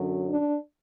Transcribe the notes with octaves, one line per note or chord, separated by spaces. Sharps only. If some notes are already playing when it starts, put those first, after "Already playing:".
Already playing: F#2 D3 F#3
D4